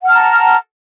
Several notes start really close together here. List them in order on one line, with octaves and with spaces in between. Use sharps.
F#5 F6 A5 A#5